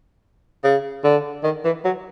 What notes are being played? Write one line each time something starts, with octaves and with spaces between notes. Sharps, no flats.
C#3
D3
D#3
E3
F#3